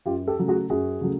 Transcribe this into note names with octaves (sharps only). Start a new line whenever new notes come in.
F#2 F4 G4
G4 A4
C#3 F#3 A3
F#4 G#4
F#2 F#4 G#4
C#3 F#3 A3